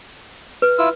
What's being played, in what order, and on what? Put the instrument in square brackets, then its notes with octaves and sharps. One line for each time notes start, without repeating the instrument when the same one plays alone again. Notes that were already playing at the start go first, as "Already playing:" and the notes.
[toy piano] B4
[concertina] E4 F4 E6